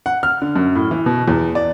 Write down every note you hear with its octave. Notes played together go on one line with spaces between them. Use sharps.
F#5
F6
D3
F#2
A2
E3
B2
E2
D5